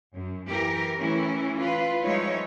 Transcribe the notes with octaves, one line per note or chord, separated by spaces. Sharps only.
F#2
E3 G4 A#4
E3 A3 C#4 E4
F4 B4
F3 G3 G#3 D#4 C#5 E5